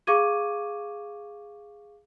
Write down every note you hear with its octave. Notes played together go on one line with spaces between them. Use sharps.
G#4 F5 C#6 D6 G#6 D#7